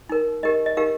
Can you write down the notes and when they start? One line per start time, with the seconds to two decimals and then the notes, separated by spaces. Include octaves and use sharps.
0.09 D#4 A#4
0.43 D#4 G4 A#4 D#5
0.66 D#5
0.77 D#4 G4 A#4 F5